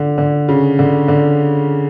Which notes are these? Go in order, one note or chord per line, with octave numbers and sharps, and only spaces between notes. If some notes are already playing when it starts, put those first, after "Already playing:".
Already playing: D3
D3
C#3
D3
D3